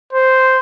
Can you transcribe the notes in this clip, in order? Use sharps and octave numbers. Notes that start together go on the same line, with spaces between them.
C5